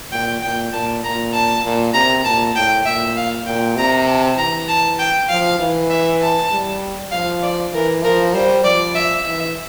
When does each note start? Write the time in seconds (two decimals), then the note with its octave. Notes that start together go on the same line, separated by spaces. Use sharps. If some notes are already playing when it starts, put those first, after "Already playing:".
0.11 A#2 G5
0.41 A#2 G5
0.72 A#2 A5
1.03 A#2 A#5
1.33 A5
1.63 A#2
1.94 C3 A#5
2.24 A#2 A5
2.54 A2 G5
2.85 A#2 E5
3.17 F5
3.46 A#2 G5
3.77 C3 A#5
4.07 A5
4.38 E3 A#5
4.68 A5
4.99 G5
5.29 F3 F5
5.59 E3
5.90 E5
6.21 A5
6.51 G3
7.11 F3 F5
7.42 D5
7.73 E3 A#4
8.03 F3 A#4
8.34 G3 C5
8.64 F3 D5
8.95 E5
9.25 E3 E5